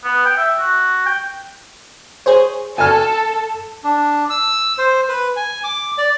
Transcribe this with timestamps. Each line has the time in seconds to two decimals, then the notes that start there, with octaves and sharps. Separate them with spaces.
0.04 B3
0.26 G5
0.38 E5
0.59 F#4
1.06 G5
2.26 G#4 C5 C#5
2.78 A4 G#5 F6
3.84 D4
4.30 E6
4.78 C5
5.09 B4
5.36 G#5
5.64 D6
5.98 D5